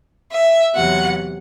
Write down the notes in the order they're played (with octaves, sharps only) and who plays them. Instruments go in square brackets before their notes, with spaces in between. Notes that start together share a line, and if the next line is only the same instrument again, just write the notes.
[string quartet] E5
E2 C3 F#3 F#5